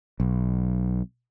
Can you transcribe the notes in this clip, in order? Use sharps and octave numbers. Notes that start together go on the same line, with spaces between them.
B1